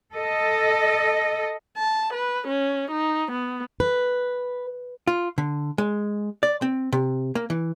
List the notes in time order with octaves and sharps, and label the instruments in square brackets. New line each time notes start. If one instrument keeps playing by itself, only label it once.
[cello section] A4 D#5
[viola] A5
B4
C#4
D#4
B3
[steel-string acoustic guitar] B4
[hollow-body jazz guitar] F4
D3
G#3
D5
C4
C3
A#3
E3